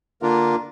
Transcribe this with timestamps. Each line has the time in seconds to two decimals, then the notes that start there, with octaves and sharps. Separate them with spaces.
0.22 D3 A#3 D4 F4 A#4